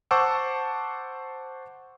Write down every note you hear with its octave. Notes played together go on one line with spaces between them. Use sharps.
C5 F#5 A5 C#6 D6 E6